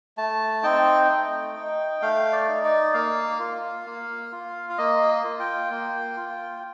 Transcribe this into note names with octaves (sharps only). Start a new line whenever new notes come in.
A3 A5
C4 D#4 G5
A3
D#4
A3 F5
D5
D#4
D5
A#3 F5
F4
A#3
F4
F5
A#3 D#5
F4
G5
A#3
F4